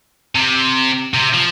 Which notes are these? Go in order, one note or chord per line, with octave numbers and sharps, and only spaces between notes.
C3
C3
F3